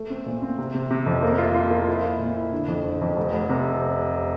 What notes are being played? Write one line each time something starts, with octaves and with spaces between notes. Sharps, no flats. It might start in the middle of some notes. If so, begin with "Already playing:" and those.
Already playing: A3
C4
A#2
C4
C3
C3
C3
F2
A#3
F4
F4
A#3
E4
E4
A#2
E4
D3
F2
D3
F2
F1
F1
C3